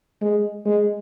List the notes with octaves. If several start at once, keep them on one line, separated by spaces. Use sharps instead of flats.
G#3
G#3